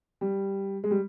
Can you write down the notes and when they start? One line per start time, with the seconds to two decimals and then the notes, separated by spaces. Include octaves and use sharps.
0.21 G3
0.84 G#3
0.91 G3